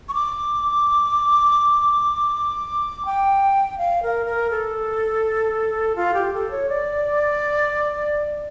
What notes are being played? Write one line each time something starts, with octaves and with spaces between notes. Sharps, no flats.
C#6
D6
G5
F5
A#4
A#4
A4
F4
G4
A4
C#5
D5